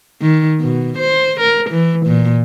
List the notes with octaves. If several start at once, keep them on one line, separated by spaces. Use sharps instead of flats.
D#3
B2
C5
A#4
E3
A#2